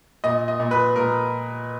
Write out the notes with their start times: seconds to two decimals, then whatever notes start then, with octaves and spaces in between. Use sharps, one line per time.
0.24 A#2 D#5
0.48 D#5
0.60 A#2
0.71 B4
0.96 A#2 A#4